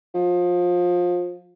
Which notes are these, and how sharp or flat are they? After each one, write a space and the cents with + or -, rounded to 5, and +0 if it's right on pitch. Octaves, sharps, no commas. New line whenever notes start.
F3 +25